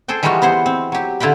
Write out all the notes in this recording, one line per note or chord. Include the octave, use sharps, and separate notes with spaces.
G#4 A4 C5 G5
E3 G3 G#3 D#4 F4 F#4
B3 E4 C5 F#5
C4
F#3 G4
D3 E4 F4 G5 B5